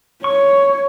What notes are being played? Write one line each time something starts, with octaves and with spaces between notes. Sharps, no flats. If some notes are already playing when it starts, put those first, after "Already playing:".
C#5 C#6